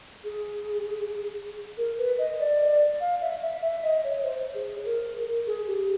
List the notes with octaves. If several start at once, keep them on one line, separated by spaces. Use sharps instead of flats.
G#4
A#4
B4
D#5
D5
F5
E5
E5
E5
D#5
C#5
C5
G#4
A#4
G#4
G4